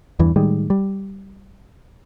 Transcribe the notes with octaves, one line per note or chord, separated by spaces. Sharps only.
E2 G2 E3
A2 D#3 G3 G#3
G3